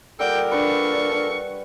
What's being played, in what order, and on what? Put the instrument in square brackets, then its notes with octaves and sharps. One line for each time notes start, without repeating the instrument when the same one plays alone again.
[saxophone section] A#2 A4 A#4 [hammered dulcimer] G3 F#5 [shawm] G5
[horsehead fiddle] D4 [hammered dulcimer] B4 [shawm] C#6